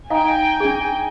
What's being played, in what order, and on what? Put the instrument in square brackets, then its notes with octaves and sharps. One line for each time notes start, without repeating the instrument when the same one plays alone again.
[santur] D#4 [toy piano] F5 [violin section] G5 G#5
[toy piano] D4 G#4